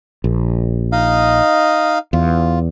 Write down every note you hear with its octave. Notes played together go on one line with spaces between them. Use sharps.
A#1
D#4 D#5 F5
E2 F4